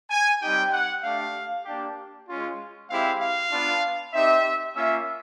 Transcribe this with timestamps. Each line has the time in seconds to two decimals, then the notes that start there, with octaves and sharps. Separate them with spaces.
0.10 G#5
0.42 G3 C4 D#4 G4 G5
0.72 F#5
1.03 A3 D4 G4 F5
1.65 A#3 D4 G4
2.28 G#3 C#4 F4
2.89 G#3 C4 E4 G4 F5
3.21 F5
3.52 B3 D4 F4
4.14 C4 D#4 G4 E5
4.76 A#3 C#4 F4 E5